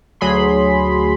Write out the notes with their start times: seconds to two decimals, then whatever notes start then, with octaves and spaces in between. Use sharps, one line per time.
0.21 D2 F#3 G#4 B5 C6